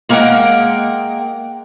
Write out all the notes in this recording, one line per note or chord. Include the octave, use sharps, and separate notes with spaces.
G#3 A#3 A#4 F#5 G5